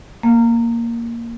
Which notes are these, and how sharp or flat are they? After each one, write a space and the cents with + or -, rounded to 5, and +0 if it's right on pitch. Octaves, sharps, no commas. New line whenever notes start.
A#3 +0